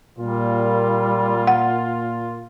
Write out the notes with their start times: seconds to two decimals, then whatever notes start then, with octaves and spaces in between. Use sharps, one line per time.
0.19 A#2 G3 F4
1.47 F#5